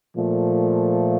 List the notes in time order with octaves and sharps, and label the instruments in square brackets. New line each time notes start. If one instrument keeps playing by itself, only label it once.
[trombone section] A#2 F3 A3